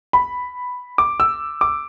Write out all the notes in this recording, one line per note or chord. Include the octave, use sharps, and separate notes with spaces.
B5
D6
E6
D6